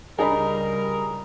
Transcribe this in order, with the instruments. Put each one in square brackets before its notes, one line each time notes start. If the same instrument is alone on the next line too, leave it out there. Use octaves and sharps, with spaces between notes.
[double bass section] C#2 G3 [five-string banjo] D4 D#4 [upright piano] G#4 A#5 B5 [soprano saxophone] A#4